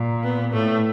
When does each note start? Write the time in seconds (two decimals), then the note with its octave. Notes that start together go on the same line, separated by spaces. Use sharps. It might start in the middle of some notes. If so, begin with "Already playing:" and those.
Already playing: A#2
0.23 B3
0.53 A2 A3